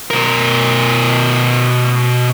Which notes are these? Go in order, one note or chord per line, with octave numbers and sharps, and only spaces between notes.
B2 A#4